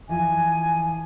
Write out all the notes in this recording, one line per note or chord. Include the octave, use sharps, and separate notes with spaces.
E3 F3 G#5